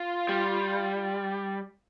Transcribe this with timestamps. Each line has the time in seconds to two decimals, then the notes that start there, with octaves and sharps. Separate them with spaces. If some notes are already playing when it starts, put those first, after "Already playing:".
Already playing: F4
0.29 G3